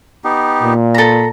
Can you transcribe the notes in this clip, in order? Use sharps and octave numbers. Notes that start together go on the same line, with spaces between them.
B3 D#4 G4
A#2
A4 A#5 B5